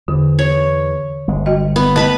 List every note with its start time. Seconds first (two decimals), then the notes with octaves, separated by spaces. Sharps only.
0.08 E2 D3
0.39 C#5
1.28 G1 G#3
1.45 F#4 D#5 G5
1.76 B3
1.96 A3 B3 B4 D#5 A5 B5